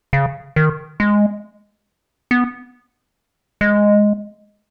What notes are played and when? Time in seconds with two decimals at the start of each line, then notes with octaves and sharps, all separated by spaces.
0.13 C#3
0.56 D#3
1.00 G#3
2.31 B3
3.61 G#3